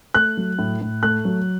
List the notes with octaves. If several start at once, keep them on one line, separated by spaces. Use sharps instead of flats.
A3 F#6
F#3
A2
A2
A3 F#6
F#3